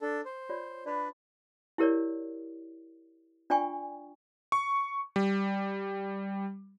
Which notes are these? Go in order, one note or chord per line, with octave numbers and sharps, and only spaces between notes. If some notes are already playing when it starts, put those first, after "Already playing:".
D4 A4
C5
F4 C#5 D5
D4 B4 D5 B5
E4 G4 A#4 C#5 D5
D4 F4 D5 G5 G#5 C#6
C#6
G3